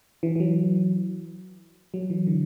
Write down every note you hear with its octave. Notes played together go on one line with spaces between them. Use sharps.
E3
E3
F#3
F#3
E3
D3